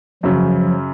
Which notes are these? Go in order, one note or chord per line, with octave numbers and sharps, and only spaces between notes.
F#2 C#3 F3 F#3